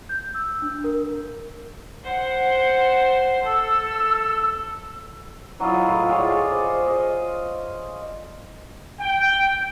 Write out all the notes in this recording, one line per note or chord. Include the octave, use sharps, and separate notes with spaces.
G6
E6
D4
A#4
C5 F#5
A4 E6
F#3 E4 F4 D#5
A2 F4
F4 G#4 C#5 D5
C5 D#5
D#5
G5